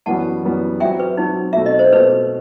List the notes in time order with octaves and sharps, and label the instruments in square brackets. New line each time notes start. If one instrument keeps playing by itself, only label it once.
[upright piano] F#2 E3 G3 B3 F#4 [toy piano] F#5 A5
[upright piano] F#2 E3 G3 B3 F#4
[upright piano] F#3 C4 F#4 [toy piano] E5 G5
[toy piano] B4
[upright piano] F#3 C4 F#4 [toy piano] D#4
[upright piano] B2 A3 C4 [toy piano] E5
[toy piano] D#5
C5
[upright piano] B2 A3 C4 [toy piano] B4